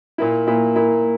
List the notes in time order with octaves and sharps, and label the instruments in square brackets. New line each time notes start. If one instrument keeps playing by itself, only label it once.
[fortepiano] A#2 A#3 E4
A#2 A#3 E4
A#2 A#3 E4